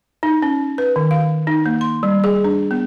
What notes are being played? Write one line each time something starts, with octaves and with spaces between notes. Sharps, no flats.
D#4
C#4
B4
D#3
F5
D#4
A#3
C6
G3
G#4
D4
B3